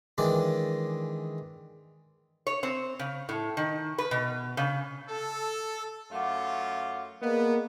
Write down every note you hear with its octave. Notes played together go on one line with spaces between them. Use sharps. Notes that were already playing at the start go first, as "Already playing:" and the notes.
D#3 E3 G#3 D4 D5
C#5
C4
C#3
A2
D#3
B4
B2
C#3
A4
F#2 A3 F4 F5 F#5 D6
A#3 B3 G#4 D5 D#5